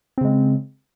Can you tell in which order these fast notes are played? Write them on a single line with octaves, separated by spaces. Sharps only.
C4 C#3 G#3